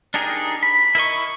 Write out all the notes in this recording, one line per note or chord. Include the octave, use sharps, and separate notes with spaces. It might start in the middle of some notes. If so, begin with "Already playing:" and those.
D4 D#4 G4 G#4 A#4
B5
E4 A#4 D#5 C#6